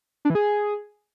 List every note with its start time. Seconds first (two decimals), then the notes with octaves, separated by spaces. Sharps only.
0.25 D4
0.30 E3
0.35 G#4